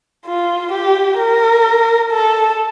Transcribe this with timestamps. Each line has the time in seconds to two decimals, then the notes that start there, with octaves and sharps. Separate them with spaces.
0.26 F4
0.71 G4
1.18 A#4
2.11 A4